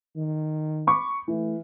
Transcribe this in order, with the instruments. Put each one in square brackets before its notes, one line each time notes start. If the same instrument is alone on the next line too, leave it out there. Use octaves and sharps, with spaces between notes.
[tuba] D#3
[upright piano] B5 C#6 D6
[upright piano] E3 [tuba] A3